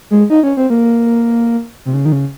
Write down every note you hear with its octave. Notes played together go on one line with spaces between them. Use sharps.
G#3
D#4
C#4
C4
A#3
C3
C#3
D#3
C#3